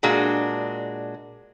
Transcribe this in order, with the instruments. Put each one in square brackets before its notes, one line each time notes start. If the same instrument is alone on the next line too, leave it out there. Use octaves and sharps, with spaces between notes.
[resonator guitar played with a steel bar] A#2 G#3 D4 F#4